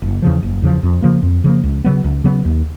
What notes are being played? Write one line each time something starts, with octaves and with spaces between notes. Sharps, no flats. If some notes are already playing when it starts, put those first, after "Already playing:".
F#1
E2 C#3 F3
F#1
E2 C#3 F3
F2
C#3 F3 A#3
F2
C#3 F3 A#3
C#2
C#3 F#3 B3
C#2
C#3 F#3 B3
D#2